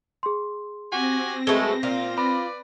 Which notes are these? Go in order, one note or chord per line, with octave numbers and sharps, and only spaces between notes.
G#4 C6
C4 F#4 G4 F#5 G#5 A#6
F#2 B2 G#3 A3 A4 G7
A#2 F4
B4 D5 B5